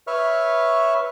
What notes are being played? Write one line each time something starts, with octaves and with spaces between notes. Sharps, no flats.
B4 C#5 E5 C#6 F6